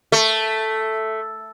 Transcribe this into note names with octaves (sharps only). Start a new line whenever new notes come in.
A3